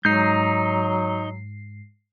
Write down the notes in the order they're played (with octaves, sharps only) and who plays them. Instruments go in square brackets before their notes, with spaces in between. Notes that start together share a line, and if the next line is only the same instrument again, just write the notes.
[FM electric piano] G#2 C7 [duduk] F#3 [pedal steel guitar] D#4 G6